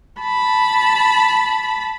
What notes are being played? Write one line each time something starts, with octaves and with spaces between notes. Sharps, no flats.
A5 B5